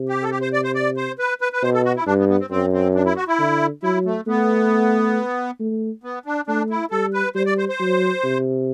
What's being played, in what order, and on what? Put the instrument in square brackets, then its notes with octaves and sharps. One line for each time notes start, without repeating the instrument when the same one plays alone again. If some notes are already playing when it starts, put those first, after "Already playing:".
Already playing: [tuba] C3
[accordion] G4
A4
G4
C5
D5
C5
D5
C5
B4
B4
B4
[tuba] B2 [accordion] C5
[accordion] A4
F#4
E4
[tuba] G2 [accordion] D4
[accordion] B3
B3
C4
[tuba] F#2 [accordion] C4
[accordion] C4
D4
E4
F#4
E4
[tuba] D3
[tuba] F#3 [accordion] E4
[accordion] A3
[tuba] A3 [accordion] B3
[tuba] A3
[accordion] B3
D4
[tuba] A3 [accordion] D4
[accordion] E4
[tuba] G3 [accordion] A4
[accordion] B4
[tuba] G3 [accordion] C5
[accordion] D5
C5
C5
[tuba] F#3
C3